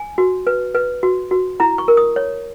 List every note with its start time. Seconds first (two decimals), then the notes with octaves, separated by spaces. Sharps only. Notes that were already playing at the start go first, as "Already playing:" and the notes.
Already playing: G#5
0.18 F#4
0.47 B4
0.75 B4
1.03 F#4
1.31 F#4
1.60 E4 A#5
1.78 C#6
1.88 A#4
1.97 D#6
2.16 C#5